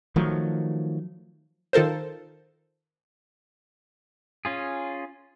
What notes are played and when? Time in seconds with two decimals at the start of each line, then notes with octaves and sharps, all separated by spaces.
0.16 D#3 F3 F#3 A3
1.73 D#3 F4 A4 A#4 C5
4.45 C#4 F4 G#4